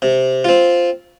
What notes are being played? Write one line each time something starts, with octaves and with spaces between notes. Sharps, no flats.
C3
C4 F4